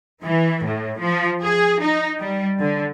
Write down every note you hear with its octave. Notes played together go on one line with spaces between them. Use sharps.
E3
A2
F3
G#4
D#4
G3
D3